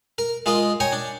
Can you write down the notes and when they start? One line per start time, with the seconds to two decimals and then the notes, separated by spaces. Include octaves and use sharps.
0.18 A#4
0.46 G#3 F4 A#4 D#5
0.80 C#5 G5 G#5 A#5
0.92 D4